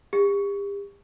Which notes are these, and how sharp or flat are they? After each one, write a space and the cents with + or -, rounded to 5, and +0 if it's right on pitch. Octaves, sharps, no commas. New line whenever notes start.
G4 +40